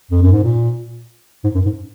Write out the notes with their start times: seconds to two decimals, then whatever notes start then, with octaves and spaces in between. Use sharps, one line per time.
0.11 F2
0.22 F#2
0.32 G#2
0.43 A#2
1.44 G#2
1.55 F#2
1.65 G#2